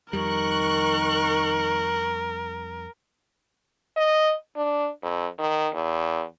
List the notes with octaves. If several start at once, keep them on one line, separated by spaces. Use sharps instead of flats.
F2 D#3 G3 A#4 C#6 F#6
D#5
D4
F2
D#3
E2